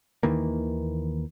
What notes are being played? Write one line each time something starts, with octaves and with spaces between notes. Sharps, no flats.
D#2 D#3 E3 A#3